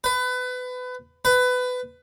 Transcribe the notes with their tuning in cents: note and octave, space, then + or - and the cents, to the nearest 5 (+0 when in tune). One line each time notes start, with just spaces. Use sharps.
B4 +25
B4 +20